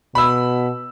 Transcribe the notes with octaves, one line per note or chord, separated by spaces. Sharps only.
B2 B5 E6